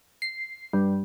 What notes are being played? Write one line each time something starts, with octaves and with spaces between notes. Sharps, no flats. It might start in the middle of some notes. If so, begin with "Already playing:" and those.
C7
G2